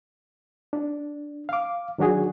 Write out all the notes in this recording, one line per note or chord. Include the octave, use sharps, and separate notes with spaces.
D4
F5 D6
D#3 F#3 D4 F#4 G#4